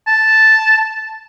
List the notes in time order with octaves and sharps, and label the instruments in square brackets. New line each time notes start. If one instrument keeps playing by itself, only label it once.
[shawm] A5